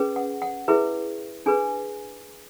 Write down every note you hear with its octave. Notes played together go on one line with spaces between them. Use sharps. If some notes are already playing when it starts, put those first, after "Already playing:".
Already playing: C#4 G#4 B4
F#5
F#5
E4 G#4 B4 E5
D4 G#4 B4 G#5